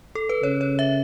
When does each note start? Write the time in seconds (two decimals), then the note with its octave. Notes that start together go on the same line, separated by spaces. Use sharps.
0.15 A4
0.29 B4
0.43 C#3 C#5
0.61 C#5
0.79 E5